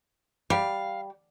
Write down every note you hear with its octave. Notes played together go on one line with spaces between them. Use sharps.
G3 F5